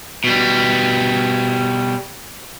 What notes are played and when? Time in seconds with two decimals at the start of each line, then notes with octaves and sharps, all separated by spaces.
0.24 B2 G3